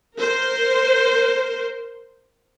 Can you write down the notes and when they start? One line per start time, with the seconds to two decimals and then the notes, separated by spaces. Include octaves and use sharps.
0.16 A#4 C5